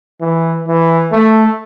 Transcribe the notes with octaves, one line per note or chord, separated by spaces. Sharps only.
E3
E3
A3